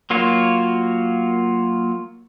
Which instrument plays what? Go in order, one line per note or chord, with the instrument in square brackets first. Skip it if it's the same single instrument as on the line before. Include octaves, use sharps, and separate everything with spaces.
[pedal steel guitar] F#3 A#3 F4 F#4 C#5